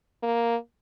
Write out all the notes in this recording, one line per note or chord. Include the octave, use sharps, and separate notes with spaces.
A#3